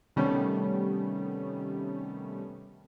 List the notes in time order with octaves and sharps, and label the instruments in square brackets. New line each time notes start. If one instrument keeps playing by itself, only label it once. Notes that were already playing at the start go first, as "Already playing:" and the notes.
[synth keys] C3 D#3 G3 A3 B3 C#4